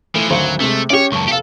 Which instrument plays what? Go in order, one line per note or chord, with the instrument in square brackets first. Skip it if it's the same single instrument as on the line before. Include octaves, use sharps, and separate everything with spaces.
[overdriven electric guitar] E3 F3 [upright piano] A3
[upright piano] G#1 D2 C5 [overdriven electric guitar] F#3
[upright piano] C3 G#3 [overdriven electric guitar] A3
[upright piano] C#4 G4 [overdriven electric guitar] C#5 D5
[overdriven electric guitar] C#2 F#2 [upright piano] A5 C#6
[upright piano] F1 F5 [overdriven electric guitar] G4 A4